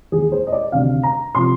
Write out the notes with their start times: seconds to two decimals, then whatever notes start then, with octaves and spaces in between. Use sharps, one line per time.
0.12 D#2 D#3 G#4
0.32 C5
0.47 D#5
0.52 D5
0.72 D2 C3 D#3 F5
1.03 A#5
1.35 C3 F3 C6